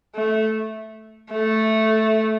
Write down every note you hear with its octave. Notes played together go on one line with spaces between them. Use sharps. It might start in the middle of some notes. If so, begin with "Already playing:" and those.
A3
A3